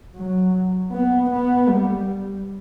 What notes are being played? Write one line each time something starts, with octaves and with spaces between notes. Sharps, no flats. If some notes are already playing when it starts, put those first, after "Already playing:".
F#3
B3
B3
G3